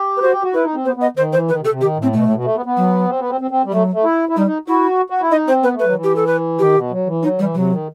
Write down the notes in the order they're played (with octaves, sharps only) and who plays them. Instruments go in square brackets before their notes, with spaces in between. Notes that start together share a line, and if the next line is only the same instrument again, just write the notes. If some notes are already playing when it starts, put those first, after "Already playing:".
Already playing: [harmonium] G4
[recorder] B4
[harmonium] F#4 [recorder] C5
[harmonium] G4
F#4
[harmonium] E4 [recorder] B4
[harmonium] D#4
C4
[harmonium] B3 [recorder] C5
[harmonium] B3
[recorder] D#5
[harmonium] D#3 [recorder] C5
[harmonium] E3 [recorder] C5
[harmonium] D#3 [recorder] B4
[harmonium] C3
[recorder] A4
[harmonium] C3
[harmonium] D#3 [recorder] G4
[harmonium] A2
[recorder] C4
[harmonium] B2 [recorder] A3
[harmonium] A2
B2
A3
B3
B3
[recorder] F#3
[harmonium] C4
B3
C4
C4
C4
G3
[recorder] F#3 [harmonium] A3
[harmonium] A3
E4
E4
[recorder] G3 [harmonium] D#4
[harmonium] D#4
[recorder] E4 [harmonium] F#4
[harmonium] F#4
E4
[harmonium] D#4 [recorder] D#5
[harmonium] C4 [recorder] C5
[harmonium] B3 [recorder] B4
[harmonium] A3
[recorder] B4
[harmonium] F#3
D#3
E3
[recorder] G4
A4
B4
[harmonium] D#3 [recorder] G4
[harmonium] B2
F#3
E3
[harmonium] F#3 [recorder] D#4
[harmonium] E3 [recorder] G3
[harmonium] C3 [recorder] F#3
[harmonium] D#3